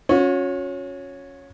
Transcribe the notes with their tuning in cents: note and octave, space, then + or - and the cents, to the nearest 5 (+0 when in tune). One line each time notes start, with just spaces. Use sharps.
C#4 -5 F#4 -45